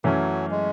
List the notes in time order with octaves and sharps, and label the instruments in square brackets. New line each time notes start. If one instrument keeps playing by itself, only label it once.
[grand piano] F#2 E3 A3 C#4 [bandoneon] F#3
[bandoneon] G#3